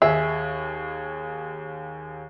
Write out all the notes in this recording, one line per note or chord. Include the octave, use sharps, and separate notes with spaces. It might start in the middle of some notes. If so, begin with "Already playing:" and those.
D#2 G#4 E5